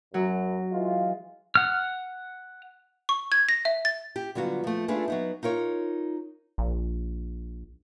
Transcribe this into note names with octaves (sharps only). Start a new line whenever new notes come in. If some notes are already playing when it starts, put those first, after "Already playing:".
F#2 F#3
E3 G#3 F4
F#5 F6
C#6
G#6
A#6
E5
A6
G4
D3 F#3 G3 B3 F4 F#4
F3 A3
A3 D4 F4 G#4 A4 B4
F#3 B3 D#4
D#4 F4 A#4 C#5
A#1